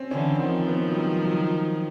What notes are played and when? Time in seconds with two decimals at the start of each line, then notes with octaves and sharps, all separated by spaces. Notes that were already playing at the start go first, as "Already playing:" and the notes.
Already playing: C4 C#4
0.11 D3 E3 C#4
0.39 D#3 F3 C4
0.68 B3
0.88 F#3
0.96 G3
1.24 F#3